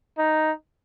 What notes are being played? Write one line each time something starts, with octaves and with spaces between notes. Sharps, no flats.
D#4